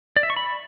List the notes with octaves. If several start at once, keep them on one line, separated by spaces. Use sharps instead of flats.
D5
E5
C#6
B5